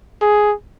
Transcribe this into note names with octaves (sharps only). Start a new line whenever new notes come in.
G#4